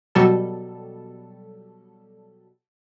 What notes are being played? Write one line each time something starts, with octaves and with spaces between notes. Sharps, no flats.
B2 F#3 G3 A4